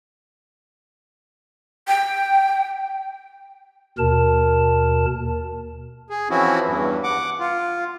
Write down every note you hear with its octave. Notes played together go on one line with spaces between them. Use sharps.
G5
D#2 B2 A#4 A5
G#4
E3 F3 C4 C#4 E4 F#4
E2 G2
F#5 D6
F4